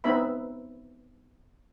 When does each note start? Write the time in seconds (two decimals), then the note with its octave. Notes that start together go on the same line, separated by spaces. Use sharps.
0.04 B3 C4 D#4 B4 E5 B5